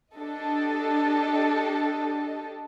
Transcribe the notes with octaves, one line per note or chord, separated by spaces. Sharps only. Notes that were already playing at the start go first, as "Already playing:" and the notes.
D4 G4 A4 D#5